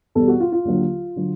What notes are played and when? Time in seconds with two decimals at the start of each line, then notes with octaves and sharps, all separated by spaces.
0.15 E2 B2 G3 A4
0.28 F#4
0.40 F4
0.52 F4
0.65 D#2 D3 F#3
1.16 D3 F#3